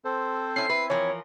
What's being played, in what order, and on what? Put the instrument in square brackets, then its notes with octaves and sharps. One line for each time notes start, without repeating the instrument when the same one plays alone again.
[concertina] C4 A4 C5
[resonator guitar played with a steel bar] C#4 E4 [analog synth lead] C7
[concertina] C4 E4 E5 [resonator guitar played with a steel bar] B4
[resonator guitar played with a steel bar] E3 F3 A#4 [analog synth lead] C#5